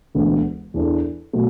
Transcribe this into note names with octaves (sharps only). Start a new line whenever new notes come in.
E1 D2 D3 B3
E2 E3 D4 A4
B2 F#3 A3